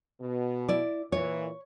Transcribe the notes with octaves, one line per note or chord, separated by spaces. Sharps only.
B2
E4 D5
A#2 E3 C#5